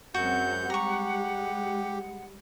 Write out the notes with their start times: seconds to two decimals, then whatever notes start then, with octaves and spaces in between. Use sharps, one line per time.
0.14 F#2 F#3 G#3 C4 F#4 F#5 G6
0.70 G3 G#3 G4 A#5 C#6